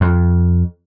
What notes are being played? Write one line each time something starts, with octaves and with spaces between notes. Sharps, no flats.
F2